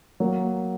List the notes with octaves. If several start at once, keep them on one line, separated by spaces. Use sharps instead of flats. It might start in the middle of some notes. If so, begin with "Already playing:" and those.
F#3 A#3